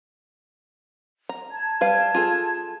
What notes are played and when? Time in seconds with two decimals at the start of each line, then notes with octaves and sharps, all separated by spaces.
1.29 A#5
1.51 A5 G#6
1.81 G3 B4 F5
2.15 F4 G#4 A4